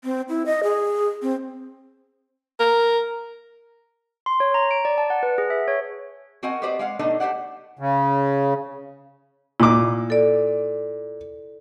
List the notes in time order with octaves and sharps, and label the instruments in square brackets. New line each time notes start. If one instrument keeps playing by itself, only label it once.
[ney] C4
E4
D#5
G#4
C4
[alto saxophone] A#4
[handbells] C6
C#5
A#5
D7
D5
A5
F#5
B4
G#4
E5
C#5
[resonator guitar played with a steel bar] C4 F#4 A#4 D#5 F#5 G#5
G4 B4 C5 D5 D#5
G#3 F5 F#5
B2 A3 D4 D#4 D5 D#5
A3 G4 C5 D5 F#5
[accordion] C#3
[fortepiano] A#2 D6 [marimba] E4
[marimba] A4 D5